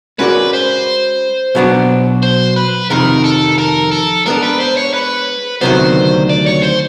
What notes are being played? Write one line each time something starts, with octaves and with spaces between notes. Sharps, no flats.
G#3 C#4 F#4 A#4 B4 D5
C5
B2 F#3 B3 D4
C5
B4
F2 C3 D#3 A#4
A4
A#4
A4
G#3 B3 D4 A#4
B4
C5
C#5
B4
D2 C3 D#3 F#3 B3 C5
D5
C#5
C5